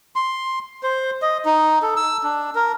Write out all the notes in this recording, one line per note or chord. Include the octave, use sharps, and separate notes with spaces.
C6
C5
D#5
D#4
A4
E6
D4
A#4